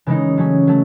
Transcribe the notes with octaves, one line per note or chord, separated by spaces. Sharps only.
C#3 E3 G#3 D#4
F#3 A3 C#4
F#3 A3